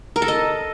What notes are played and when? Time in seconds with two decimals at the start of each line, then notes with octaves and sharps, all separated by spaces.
0.16 A#4
0.22 A4
0.28 D#5